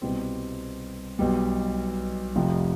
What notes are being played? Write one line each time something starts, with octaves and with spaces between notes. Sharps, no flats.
C2 B2 G3 C4
B1 B2 G3
F1 F2 C3 F3